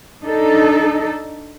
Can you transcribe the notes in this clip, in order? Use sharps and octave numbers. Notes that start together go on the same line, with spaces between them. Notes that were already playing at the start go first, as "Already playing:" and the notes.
D4 D#4 A4